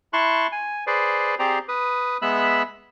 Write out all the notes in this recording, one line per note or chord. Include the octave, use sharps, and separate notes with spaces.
E4 A5 C6 C#6 F#6
G#5
G#4 B4 C5 D5
C4 G4 G#4 C5 D5 A#5
B4 D#6
G#3 B3 E5 B5 E6 F#6